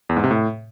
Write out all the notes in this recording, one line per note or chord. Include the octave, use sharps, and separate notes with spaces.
E2
G#2
C3
A2